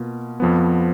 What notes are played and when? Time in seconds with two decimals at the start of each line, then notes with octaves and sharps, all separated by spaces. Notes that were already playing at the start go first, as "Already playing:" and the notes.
Already playing: B2 A#3 F4
0.40 F2 F3 B3